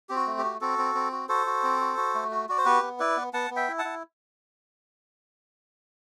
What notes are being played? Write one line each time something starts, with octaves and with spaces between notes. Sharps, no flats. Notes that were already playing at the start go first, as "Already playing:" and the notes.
C4 G4
F#4
A3
G4
F#4
C4 F#4 A4
C4
C4
F#4
F#4 A4 C5
F#4
C4
F#4
F#4
A3
F#4
F#4 D5
C5
B3 G4 B4
B3
E4 B4 D5
B3
B3 F#5 A5
B3
E5 G5
E4
F#5 A5
E4